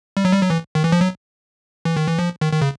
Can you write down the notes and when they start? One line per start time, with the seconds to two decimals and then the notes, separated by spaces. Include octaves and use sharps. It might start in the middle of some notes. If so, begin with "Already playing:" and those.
0.17 G3
0.25 F#3
0.33 G3
0.42 F#3
0.50 E3
0.75 D#3
0.84 E3
0.92 F3
1.01 F#3
1.85 E3
1.97 D#3
2.08 E3
2.19 F3
2.41 D#3
2.53 D#3
2.61 C#3